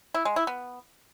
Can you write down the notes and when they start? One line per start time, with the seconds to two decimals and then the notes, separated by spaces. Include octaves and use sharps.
0.14 E4
0.25 G#3
0.36 E4
0.47 B3